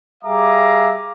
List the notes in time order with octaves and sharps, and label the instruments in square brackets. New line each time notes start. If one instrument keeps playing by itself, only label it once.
[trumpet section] G3 G#4 E5 F5 A#5 D6